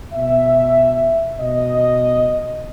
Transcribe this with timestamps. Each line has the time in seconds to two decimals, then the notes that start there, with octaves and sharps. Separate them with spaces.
0.14 B2 E5
1.39 B2 D#5